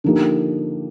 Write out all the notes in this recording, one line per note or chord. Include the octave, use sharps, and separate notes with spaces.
D3 F3 A#3 D#4 G4